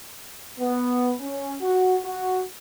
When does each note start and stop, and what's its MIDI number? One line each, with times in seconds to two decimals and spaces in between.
0.60 1.13 59
1.20 1.55 61
1.62 1.97 66
2.05 2.42 66